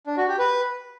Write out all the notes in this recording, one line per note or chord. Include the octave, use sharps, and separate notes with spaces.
D4
F#4
G4
B4